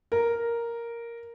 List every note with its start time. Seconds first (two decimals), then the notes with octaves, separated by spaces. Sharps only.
0.12 A#4